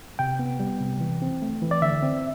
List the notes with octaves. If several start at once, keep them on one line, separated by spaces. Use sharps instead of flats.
C3 G5
B3
G3
C3
E3
C4
A3
E3
D5
D3 E5
C4